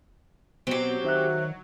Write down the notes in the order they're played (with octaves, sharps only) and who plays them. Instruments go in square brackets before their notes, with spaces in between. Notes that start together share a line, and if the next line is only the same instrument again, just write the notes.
[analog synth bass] B2 [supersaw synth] F#3 [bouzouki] C4 G4
[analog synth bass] D#3 [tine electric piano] C5 E5 F#6